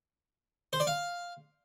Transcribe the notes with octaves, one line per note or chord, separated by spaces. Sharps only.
C5
D5
F5